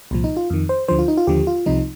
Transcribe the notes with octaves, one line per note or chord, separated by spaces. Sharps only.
C2 A#2 F3
D#4
F4
F2 D#3
C5
D2 D3 F3 C5
F4
D#4
F4
D#2 D3 F3 G4
F4
C2 C3 F3 D#4